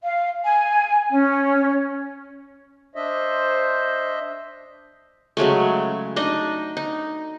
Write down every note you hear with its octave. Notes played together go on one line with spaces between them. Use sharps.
F5
G#5
C#4
D4 C5 D#5 E5
C#3 F#3 G#3 A3
D4 D#4 D#5
D#4